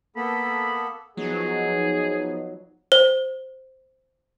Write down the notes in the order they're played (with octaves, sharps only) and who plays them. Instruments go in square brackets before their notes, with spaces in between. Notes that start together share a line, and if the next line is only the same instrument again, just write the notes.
[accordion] A#3 B3 A4 [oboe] B5
[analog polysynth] F3 B3 D#4 [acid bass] F#3 [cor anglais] G#4
[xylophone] C5